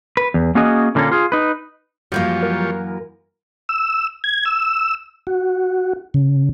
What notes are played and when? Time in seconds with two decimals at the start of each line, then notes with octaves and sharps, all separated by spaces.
0.17 B4
0.34 E2
0.55 A#3 C#4 F#4 G#4 D#5
0.95 A#2 D3 G3 A#3 C#4 A4
1.12 F4 G#4
1.32 D#4 B4
2.12 F#2 E3 F3 G3 A#3 C#5 G6
2.43 A#4
3.69 E6
4.24 G#6
4.45 E6
5.27 F#4
6.14 C#3